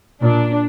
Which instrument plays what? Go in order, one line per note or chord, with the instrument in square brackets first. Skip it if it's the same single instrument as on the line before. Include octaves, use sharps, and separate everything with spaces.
[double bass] A#2 [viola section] D4